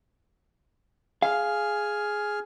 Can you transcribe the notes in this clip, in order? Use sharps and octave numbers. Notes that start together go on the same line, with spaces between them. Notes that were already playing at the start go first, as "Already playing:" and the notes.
G#4 F5 G#5 F6